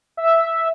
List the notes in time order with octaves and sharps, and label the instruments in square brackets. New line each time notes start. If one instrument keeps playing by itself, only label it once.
[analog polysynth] E5